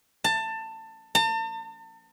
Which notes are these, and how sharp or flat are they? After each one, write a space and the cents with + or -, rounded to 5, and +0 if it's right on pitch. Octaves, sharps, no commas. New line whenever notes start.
A5 +20
A5 +40